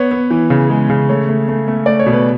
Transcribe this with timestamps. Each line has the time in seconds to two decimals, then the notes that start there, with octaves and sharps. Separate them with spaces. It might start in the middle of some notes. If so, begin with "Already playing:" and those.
Already playing: B3 C#5
0.11 B3
0.31 E3
0.50 C#3
0.70 G#3
0.90 C#3
1.09 A3 C#5
1.29 A3
1.49 A3
1.68 A3
1.86 A3 D5
2.00 C#5
2.06 B2
2.13 B4